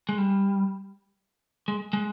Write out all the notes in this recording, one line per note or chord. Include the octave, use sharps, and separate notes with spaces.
G#3
G3
G#3
G#3